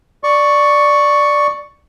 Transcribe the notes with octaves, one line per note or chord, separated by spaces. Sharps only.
D5 C#6